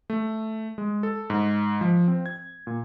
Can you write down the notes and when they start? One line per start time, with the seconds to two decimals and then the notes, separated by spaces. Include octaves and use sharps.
0.10 A3
0.78 G#3
1.03 A4
1.30 G#2
1.81 F3
2.08 C4
2.26 G#6
2.67 A#2